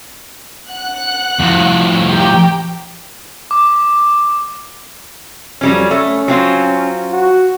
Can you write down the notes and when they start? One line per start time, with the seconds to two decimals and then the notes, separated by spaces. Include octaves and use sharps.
0.71 F#5 F#6
1.39 F2 A2
2.10 G4 G5 A#5
3.51 D6
5.61 F2 F#3 G3 C#4
5.91 A3 C#4
6.28 F#3 C4 F4
7.11 F#4